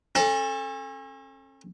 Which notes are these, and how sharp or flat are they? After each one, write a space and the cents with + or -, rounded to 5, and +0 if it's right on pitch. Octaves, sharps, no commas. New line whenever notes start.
C#4 -40 A4 +0